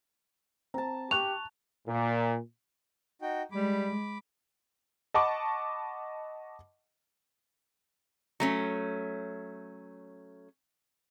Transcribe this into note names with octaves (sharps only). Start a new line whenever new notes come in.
C4 A5 A#5
G4 C#6 F#6 F7
A#2
D#4 F#4 G5
G3 G#3 B5 D6
D#5 F#5 A5 B5 C#6 D6
F#3 A3 C#4